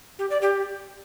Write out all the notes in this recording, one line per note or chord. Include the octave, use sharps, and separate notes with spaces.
G4
D5
G4